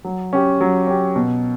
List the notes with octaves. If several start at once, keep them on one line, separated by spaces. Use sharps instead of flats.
F#3
C#4 G4
F#3
C#4 G4
B2